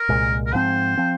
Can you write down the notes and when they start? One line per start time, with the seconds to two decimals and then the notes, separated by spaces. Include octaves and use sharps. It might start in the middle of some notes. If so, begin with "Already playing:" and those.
Already playing: A#4
0.09 C2 A#2 G#3
0.46 A#4
0.53 G#2 F3 C4 C5
0.97 F3 C4